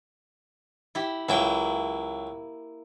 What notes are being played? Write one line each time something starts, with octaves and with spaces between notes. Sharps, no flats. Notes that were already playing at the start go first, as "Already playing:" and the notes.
E4 G4
C#2 F#3 A#3 E4 G5